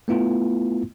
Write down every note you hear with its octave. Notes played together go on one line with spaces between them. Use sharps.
A3 B3 E4 F4